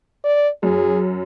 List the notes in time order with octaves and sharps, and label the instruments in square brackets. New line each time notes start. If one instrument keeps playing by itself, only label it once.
[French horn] D5
[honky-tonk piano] F#2 [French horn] G#4